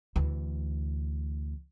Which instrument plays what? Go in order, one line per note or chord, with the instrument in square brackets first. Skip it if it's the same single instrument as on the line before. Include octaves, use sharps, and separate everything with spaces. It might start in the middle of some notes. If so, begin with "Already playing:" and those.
[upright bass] D2 E3